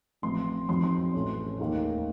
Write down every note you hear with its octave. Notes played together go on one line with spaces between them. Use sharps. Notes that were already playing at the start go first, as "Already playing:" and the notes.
A1 A2 F3 C4 C6
F2 D#3 F#3 C4 C6
C6
A1 A2 A3 C#4
F1 D#2 D#3 A#3